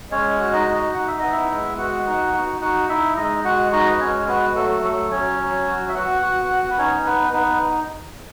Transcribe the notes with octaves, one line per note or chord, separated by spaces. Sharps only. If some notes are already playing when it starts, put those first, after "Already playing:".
G#3 C#4 C#5
F#4
D#4 D#5
D#4
D#4 F#5
E5
B3 D#5
E4 E5
G#3
B3 F#4 F#5
D#4
F#4
D#4 F#4 F#5
D#4 E4 E5
G#3 D#4 D#5
G#3 F#4 F#5
D#4 F#4 D#5
B4
G#3 C#4 C#5
B3 F#4 B4
F#3 A3 A4
F#3 A3 A4
F#3 C#4 C#5
F#3
F#4
E5
B3 F#4 F#5
F#4
B3
B4
C#4 D#4 C#5
B3 B4
B3 D#4 B4